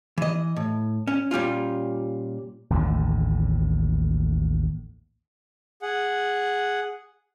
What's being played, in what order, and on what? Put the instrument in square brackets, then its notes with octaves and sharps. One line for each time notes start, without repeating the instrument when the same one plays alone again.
[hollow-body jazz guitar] E3 D#5
A2
C#4
A#2 G3 C#4 F4
[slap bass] A1 D#2 A2 D3
[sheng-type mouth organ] G#4 F#5